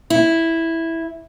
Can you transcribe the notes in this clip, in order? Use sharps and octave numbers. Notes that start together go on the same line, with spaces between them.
E4